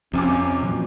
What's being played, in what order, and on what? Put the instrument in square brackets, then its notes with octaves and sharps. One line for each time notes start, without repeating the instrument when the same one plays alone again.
[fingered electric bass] F2 [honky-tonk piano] C3 G#5 D6 [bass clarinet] C#4
[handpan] A#2 E3 F#3